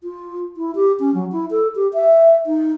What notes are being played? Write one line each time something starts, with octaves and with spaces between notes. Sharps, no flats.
F4
E4
G4
C#4
F#3
E4
A4
G4
E5
D#4